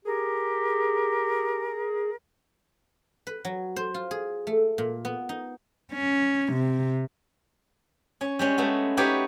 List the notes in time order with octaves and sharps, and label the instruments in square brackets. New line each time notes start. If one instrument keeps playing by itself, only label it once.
[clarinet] G4 [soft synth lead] G#4 [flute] A#4
[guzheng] B4
F#3
C5
F4
G#4
A3
A#2
B3
D#4
[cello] C#4
C3
[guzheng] C#4 C#5
G3 G#3 C#4
G#3 A3 B3 F#4
D#4 F#4 G4 B4 C#5 D5